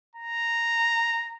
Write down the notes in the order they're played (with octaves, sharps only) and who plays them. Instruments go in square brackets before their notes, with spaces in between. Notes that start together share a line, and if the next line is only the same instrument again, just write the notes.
[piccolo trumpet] A#5